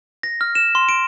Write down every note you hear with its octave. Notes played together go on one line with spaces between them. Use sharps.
A#6
F6
E7
C6
D7